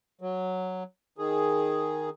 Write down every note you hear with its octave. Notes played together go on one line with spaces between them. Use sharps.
F#3
D#3 G#4